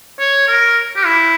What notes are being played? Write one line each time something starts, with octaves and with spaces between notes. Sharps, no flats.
C#5
A#4
G4
E4